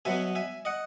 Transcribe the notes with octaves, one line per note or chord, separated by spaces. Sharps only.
B2 F#3 B3 E5 G#5
E5 G#5
D#5 F#5